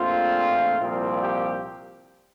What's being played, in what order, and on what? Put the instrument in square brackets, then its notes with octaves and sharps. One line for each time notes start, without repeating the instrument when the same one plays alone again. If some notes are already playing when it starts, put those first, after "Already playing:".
Already playing: [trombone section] A#1 A#2 A3 C4 F4
C2 A#2 F3 C4
G4